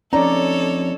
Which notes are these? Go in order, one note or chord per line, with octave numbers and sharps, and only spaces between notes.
F2 C#4 D#4 A4 C#5 D5 A#5